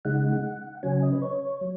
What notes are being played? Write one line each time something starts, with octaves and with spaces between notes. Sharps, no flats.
C#3 G#3 D#4 F#5
C#3 F#3 C#4 G#5
D#5
B4
C#5
F#3